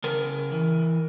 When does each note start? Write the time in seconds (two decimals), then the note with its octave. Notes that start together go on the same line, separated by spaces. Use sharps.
0.04 C#3 A#4
0.52 E3